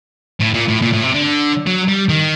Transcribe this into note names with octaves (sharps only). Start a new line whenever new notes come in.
A2
A#2
A2
A#2
A2
C3
D3
F#3
G3
D#3